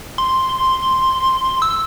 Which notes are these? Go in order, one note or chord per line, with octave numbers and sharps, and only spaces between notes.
C6
E6